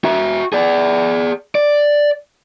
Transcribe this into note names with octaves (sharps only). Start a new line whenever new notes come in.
F#4 E5
G#4 D5
D5